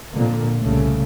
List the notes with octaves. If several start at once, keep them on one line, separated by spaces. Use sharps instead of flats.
F2 A#2 D3 A#3
C2 C#3 A3